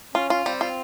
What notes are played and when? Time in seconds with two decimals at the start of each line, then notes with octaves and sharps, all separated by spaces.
0.14 C#4 F4
0.30 F4
0.45 G3 C4
0.61 F4